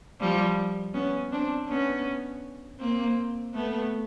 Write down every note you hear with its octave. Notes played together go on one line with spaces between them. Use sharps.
F3 G3
B3 C#4
C4 D4
B3 C#4
A#3 C4
A3 B3